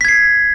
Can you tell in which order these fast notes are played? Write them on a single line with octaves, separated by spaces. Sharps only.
B6 G#6 C7